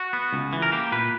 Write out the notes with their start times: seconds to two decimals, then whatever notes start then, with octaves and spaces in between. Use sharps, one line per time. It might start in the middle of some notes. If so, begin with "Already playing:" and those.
Already playing: F#4
0.13 B3
0.33 C#2
0.53 E3
0.62 A#4
0.72 A#3 G4
0.92 A#2 B4